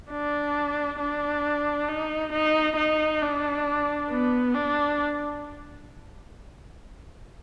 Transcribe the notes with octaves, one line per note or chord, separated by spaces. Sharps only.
D4
D4
D#4
D#4
D#4
D4
B3
D4